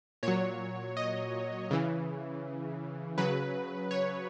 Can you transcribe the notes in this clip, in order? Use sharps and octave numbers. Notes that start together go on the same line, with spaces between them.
A#2 F#3 C#5
D#5
C#3 E3
C#3 F#3 B4
C#5